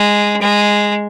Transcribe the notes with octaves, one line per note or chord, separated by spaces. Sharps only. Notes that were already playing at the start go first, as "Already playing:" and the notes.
Already playing: G#3
G#3